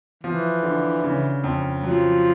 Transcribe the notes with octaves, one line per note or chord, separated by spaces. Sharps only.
E3 F3
D3
C#3
F2
F3 F#3